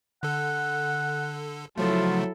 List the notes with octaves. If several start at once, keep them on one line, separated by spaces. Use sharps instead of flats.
D3 A4 F#5
C#3 F3 F#3 A3 E4 F4 A4